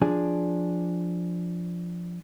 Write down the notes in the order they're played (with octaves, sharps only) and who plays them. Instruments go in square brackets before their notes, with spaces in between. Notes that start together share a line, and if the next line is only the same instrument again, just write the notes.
[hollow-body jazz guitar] F3 D4 G#4